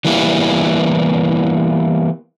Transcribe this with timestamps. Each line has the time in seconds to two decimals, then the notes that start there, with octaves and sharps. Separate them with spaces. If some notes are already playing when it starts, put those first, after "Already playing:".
0.05 E3 G3 A#3 B3 E4